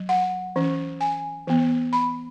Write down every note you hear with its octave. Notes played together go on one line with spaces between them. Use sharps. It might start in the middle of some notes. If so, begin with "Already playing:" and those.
Already playing: F#3
F#5
E3 C#4
G#5
E3 B3
B5